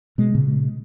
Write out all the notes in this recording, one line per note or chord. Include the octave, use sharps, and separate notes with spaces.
B2 G#3
A#2 C#3